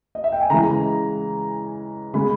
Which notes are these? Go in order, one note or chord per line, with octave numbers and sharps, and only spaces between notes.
D#5
E5
G5
G#5
C#3 E3 G#3 A#5
C#3 G#3 B5